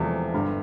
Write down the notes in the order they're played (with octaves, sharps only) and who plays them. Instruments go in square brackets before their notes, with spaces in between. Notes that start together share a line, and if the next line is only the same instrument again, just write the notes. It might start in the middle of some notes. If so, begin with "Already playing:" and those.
Already playing: [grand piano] E1 E2 C3 F3 A3
G1 G2 D3